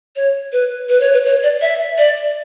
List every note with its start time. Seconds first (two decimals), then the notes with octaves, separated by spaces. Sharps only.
0.16 C#5
0.52 B4
0.89 B4
1.00 C#5
1.13 B4
1.25 C#5
1.43 D5
1.61 E5
1.98 D5